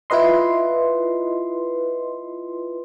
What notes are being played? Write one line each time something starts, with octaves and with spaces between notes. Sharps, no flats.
E4 F4 B4 D#5 C6